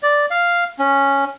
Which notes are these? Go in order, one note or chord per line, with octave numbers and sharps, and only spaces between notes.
D5
F5
C#4